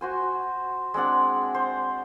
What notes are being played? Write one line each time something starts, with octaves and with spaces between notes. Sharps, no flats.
F#4 C5 G#5
G#3 C4 D4 F#5
C5